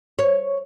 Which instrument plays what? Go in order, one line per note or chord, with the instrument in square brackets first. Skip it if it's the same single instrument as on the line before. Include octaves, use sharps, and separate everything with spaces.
[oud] C#5